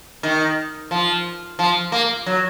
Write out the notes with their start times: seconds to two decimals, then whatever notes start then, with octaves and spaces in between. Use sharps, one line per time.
0.23 D#3
0.91 F3
1.59 F3
1.92 A#3
2.26 F#3